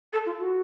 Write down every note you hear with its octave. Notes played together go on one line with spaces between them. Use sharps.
A4
F4
F#4